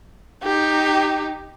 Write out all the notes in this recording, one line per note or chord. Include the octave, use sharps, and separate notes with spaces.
D#4 G4